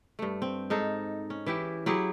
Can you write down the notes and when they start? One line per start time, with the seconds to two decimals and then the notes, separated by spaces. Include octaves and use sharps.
0.19 G2 A3
0.42 C4
0.70 G#2 D#4 A4
1.30 C#4
1.46 E3 E4 G4
1.86 F#3 E4 G4 G#4